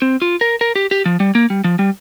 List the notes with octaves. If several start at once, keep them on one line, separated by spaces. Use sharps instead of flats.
C4
F4
A#4
A#4
G4
G4
F3
G3
A#3
G3
F3
G3